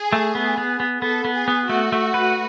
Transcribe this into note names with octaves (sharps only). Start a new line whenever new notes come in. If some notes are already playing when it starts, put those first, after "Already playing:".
Already playing: G#4
A3
B3
B3
B3
B3 A4
B3
G#4
B3
A3 F#4
A3
B4